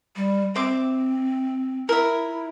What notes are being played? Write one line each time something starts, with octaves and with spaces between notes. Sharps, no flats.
G3
C4 C5 E5 D6
E4 A#4 E5